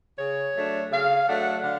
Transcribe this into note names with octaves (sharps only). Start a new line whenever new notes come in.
C#3 C#5
F#3 A3 D4
C#3 F5
F#3 A3 D4 F#5
D3 F5